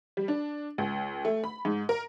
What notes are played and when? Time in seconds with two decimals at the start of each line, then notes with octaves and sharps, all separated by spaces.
0.17 G3
0.28 D4
0.78 C#2
1.25 A3
1.44 B5
1.65 G#2
1.89 A#4